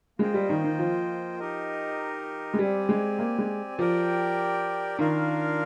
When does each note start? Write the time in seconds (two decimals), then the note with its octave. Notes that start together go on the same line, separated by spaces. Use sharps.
0.19 G#3 A#3 F4 C5 D#5 G5
0.34 G3
0.49 D#3
0.64 D#3
0.79 F3
1.39 D#4 G4 A#4 D#5
2.54 G#3
2.59 G3 C4 G4 D5 G#5
2.89 G#3
3.19 A#3
3.38 G#3
3.78 F3 G4 A#4 D5 G5
4.98 D#3 D4 F4 A#4 F5